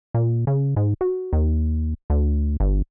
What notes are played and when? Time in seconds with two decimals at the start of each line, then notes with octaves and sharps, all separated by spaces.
0.14 A#2
0.47 C#3
0.76 G#2
1.01 F#4
1.33 D#2
2.10 D2
2.60 G1